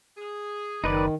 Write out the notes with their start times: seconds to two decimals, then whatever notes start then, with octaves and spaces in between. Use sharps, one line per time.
0.17 G#4
0.84 F#1 D#3 D#4 B4 D5